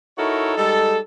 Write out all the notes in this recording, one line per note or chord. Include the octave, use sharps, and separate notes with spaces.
D#4 E4 F#4 A4 A#4 C#5
G3 G#3 D#4 A4